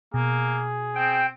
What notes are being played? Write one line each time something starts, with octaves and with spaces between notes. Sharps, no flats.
B2 A#3 G#4
C4 G5